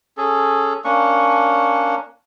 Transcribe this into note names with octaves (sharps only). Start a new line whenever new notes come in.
C#4 G#4 A4
A#3 C#4 D4 C#6